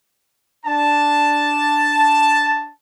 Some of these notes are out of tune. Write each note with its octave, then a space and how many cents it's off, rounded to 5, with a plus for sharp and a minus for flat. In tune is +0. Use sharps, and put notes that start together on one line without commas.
D4 +0 A5 +0